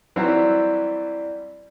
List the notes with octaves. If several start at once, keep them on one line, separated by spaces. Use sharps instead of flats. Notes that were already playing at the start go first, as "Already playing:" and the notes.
E3 F#3 G3 C4 E4